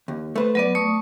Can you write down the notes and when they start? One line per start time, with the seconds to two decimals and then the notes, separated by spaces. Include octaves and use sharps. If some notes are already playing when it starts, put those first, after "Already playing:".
0.08 D#2
0.36 A3 B4 C5
0.55 F#3 B3 B4 D5
0.75 A3 C#6 D#6